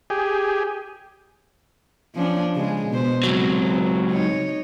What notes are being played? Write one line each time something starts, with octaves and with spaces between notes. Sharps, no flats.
G4 G#4
F3 C#4 D4
C#3 G#3
B2 C5
C#2 F#3 C4
D#4 C#5